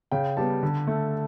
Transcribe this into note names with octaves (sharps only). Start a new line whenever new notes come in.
C#3 G5
G3 B3 A5
D3
A3